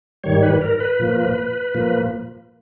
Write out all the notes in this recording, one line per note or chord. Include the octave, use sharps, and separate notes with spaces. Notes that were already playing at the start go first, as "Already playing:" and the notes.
G#2 D#3 G3 C#5
B4
A#4
B4
A#2 F3 A#3
A#2 F3 A#3